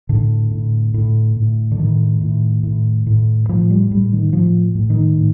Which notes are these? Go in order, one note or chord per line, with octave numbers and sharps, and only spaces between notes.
A2 D3
A2
A2
A2
D3
A2 D#3
A2
A2
A2
A2 F3
G3
A2 G3
D#3
A2 F3
A2
D#3
A2